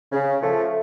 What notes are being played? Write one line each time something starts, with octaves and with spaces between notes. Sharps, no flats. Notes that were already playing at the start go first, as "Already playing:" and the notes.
C#3
F3 A3